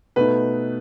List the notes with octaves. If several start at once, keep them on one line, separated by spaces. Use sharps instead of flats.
B2 A3 D#4 B4